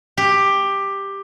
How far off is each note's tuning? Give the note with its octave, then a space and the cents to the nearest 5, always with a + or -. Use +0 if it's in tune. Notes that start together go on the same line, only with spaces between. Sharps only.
G4 +10